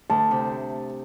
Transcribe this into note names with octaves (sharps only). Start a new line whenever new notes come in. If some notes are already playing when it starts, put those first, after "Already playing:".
D2 A5
C3